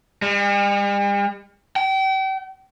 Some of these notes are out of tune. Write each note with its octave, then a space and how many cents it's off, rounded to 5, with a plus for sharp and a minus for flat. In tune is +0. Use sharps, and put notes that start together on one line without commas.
G3 +45
G5 -35